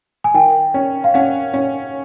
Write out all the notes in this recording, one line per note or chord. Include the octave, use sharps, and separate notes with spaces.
G#5
D#3 G5
C#4
F5
C#4 F#5
C#4